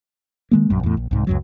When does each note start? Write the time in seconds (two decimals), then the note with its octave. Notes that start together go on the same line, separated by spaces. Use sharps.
0.51 D#3 G#3 A#3
0.70 A#1 F#2
0.83 E2 A2
0.97 A#1
1.11 C2 G#2
1.27 C#2 F#2 F#3